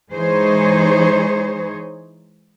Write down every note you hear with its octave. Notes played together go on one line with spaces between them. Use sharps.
E3 G#3 D#4 G#4 C5 C#5